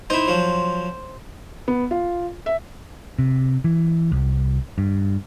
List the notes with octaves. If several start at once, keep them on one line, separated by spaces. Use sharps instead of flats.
D#4 E4 C5
F3 F#3
B3
F4
E5
C3
E3
C2
G2